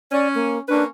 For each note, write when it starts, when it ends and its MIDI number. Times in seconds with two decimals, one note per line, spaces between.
0.12 0.59 61
0.12 0.28 74
0.35 0.58 58
0.69 0.85 58
0.69 0.85 61
0.69 0.83 62
0.69 0.85 71